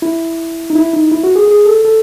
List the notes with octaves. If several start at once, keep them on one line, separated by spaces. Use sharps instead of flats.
E4
D#4
E4
D#4
E4
F#4
G#4
G#4
A4
A4